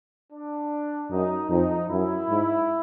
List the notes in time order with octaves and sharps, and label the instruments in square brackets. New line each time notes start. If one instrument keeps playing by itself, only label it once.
[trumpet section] D4
[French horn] F#2 [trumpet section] D#4
[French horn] F2 [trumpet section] D#4
[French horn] F#2 [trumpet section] E4
[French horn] G#2